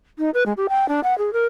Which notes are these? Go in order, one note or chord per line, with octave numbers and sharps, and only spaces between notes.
D#4
B4
G#3
G4
G5
D4
F#5
G#4
A#4